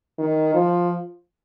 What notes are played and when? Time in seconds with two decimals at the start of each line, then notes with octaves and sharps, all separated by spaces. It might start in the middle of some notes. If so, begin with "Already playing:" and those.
0.19 D#3
0.54 F3